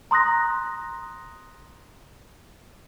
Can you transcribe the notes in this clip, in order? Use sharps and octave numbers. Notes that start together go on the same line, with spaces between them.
A#5 C6 D#6 F#6 A#6